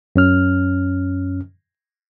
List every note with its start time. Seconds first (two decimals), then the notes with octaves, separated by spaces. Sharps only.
0.16 F#2 C#4 F6